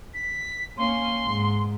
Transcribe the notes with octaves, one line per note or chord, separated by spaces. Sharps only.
B6
A#3 C#4 C6
G#2